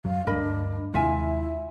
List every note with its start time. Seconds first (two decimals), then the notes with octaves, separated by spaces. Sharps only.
0.05 F#2 F#3 F5
0.27 D2 G2 A3 D4 A#4 D#5 B5
0.94 D#2 C3 G#3 E4 F4 E5 G#5